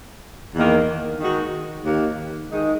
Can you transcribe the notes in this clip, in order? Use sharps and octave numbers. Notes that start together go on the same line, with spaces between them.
E2 D#3 A#3
D#3 G#3 D#4 F#4
D#2 D#3 A#3
D#3 G#3 D#4